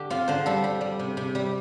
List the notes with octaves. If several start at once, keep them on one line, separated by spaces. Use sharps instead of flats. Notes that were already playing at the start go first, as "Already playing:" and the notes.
Already playing: D3 G4
C4 F4
D3 C5
G3 A4
G3
G3
C3
C3
G3